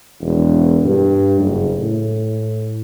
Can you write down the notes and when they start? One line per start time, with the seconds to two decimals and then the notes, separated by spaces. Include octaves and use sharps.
0.21 E1
0.84 G2
1.40 F#1
1.78 A2